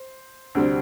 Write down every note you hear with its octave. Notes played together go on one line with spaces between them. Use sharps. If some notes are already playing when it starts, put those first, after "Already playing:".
Already playing: C5
D2 C3 G3 C4